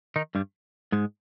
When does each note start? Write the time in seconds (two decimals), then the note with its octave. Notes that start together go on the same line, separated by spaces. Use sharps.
0.16 D#3 D#4
0.35 G2 G3
0.92 G#2 G#3